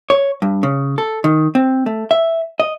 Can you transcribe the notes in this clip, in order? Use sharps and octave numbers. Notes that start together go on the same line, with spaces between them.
C#5
G2
C#3
A4
D#3
C4
A3
E5
D#5